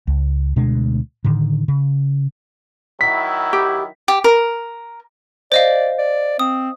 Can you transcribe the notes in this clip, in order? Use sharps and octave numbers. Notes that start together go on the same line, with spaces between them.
C#2
D2 B2 G#3 D4
A2 D3 D#3
C#3
D#3 F#3 E4 B6
G4
G4
A#4
C5 D5 D#5 F5
D5
C4 D#6